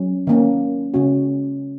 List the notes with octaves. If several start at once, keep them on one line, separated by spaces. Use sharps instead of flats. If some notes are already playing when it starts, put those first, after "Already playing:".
Already playing: F#3 C#4
D#3 A#3 C#4
C#3 G#3 C#4 F#4